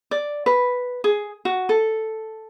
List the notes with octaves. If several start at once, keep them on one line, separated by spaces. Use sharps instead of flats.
D5
B4
G#4
F#4
A4